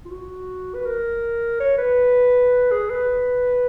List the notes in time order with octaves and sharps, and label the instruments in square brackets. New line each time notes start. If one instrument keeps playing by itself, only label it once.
[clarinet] F4
F#4
B4
A#4
C#5
B4
G#4
B4